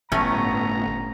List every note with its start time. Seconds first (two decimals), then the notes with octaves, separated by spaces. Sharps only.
0.12 G1 A2 A3 B3 C#4 A#5